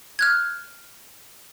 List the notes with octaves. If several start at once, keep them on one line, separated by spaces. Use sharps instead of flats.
F6 F#6 G#6